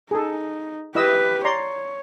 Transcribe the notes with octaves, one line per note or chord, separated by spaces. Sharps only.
D#4 G#4 A4
E4 G4 B4 D#5 E6
C#5 D5 A#5 C6